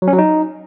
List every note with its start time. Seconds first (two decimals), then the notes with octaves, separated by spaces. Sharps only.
0.02 F#3
0.08 C#4
0.13 F#3
0.19 D#4